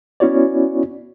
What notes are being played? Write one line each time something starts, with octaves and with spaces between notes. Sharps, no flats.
B3 C#4 E4 F#4 C#5 D5